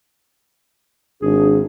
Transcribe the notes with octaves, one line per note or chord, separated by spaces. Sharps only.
G#1 D4 G#4